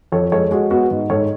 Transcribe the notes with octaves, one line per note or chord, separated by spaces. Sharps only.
F2 A4 C#5
G#3 A4 C#5
G#3 F#4
B3 F#4
G#2
G#2 A4 C#5